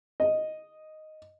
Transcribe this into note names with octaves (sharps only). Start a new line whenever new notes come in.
D#5